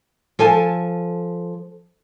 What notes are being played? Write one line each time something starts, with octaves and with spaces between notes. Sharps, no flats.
F3 A4 G#5 A5